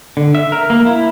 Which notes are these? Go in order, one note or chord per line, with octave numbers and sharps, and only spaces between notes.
D3
E5
A#4
A#3
E4